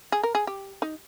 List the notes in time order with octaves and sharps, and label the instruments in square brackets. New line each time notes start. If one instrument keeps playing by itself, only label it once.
[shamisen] G#4
A#4
G#4
G4
D#4